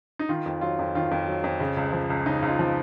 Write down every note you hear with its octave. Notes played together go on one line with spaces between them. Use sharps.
D#4
D#3 F4
F2
F#3 F4
F2
D#3 F4
F2
F#3
F2
C#3
C#2
F3
C#2
C#3 D#4
C#2
F4
F3